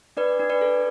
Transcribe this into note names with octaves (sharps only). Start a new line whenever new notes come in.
D4 B4 D5
D4
B4 D5
A4